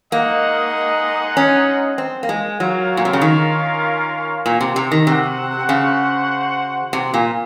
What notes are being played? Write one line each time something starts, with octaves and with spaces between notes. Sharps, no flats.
G#3 A#3 D#4 G#4 D#5 F#5
C#4
C4
A#3
G#3
F#3 C#4 F4 A#4 C#5 F5
A#2
C3
C#3
D#3
A#2
C3
C3
D#3
C3 F#4 C5 F#5
C#3
C3
A#2